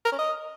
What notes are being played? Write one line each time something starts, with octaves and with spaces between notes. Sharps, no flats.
A#4
C#4
D#5